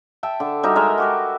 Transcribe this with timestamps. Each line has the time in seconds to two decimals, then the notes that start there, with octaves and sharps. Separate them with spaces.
0.23 E5 G5 A5
0.40 D3
0.63 G3 D#4 F#4 E5
0.76 G#3 A#4 D#5 E5
0.98 F#4 G4 B4